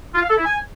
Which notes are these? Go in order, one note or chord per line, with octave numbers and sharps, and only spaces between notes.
F4
F5
A4
E4
G#5